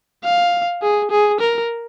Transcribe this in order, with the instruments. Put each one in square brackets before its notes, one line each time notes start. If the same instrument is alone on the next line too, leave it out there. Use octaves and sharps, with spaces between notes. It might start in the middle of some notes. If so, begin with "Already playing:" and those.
[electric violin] F5
G#4
G#4
A#4